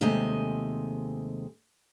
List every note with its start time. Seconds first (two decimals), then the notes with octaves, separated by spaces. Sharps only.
0.01 D#2 C3 G#3 A3 D#5 G#5